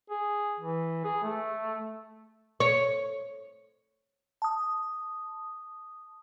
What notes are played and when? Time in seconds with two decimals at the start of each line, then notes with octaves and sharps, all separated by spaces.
0.10 G#4
0.59 E3
1.05 G#4
1.23 A3
2.60 C#5
4.42 A5 D#6